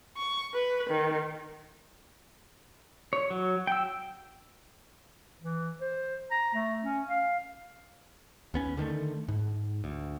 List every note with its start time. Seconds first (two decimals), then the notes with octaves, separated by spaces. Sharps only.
0.17 C#6
0.55 B4
0.89 D#3
3.13 C#5
3.30 F#3
3.67 G5 E6
5.42 E3
5.81 C5
6.31 A#5
6.54 A3
6.85 C#4
7.07 F5
8.54 D#2 B3 C#4
8.77 D3 D#3 G#3 A3
9.28 G#2
9.84 D2